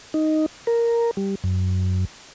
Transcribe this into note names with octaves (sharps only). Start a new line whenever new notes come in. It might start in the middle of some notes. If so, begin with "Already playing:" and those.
D#4
A#4
G3
F#2